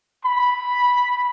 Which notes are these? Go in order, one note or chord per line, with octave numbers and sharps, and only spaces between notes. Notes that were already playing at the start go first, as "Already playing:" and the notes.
B5